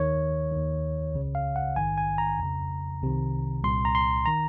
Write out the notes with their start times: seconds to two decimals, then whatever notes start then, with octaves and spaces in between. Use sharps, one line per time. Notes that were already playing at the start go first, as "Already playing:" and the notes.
Already playing: D#2 D#3 C#5
0.52 D#2 D#3
1.14 C#2 C#3
1.35 F5
1.56 F#5
1.76 A#1 G#2 D#3 G#5
1.98 G#5
2.18 A#5
2.39 F2 C#3
3.02 C2 C3 D#3
3.63 C2 A#2 C6
3.85 A#5
3.95 C6
4.26 D#3 A#5